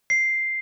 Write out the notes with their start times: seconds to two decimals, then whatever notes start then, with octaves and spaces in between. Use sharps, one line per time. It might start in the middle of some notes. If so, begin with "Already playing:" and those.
0.10 C7